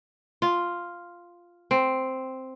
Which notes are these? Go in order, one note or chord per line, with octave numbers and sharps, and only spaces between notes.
F4
C4